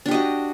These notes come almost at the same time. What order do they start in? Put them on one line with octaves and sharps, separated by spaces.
D4 G4 D#5 F#4